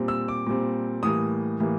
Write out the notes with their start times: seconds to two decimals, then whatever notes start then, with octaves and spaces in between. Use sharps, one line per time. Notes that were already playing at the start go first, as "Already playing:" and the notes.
Already playing: A#2 G3 C4
0.08 E6
0.28 D6
0.47 A#2 G3 C4
1.03 A2 E3 G3 A#3 D#6
1.60 A2 E3 G3 A#3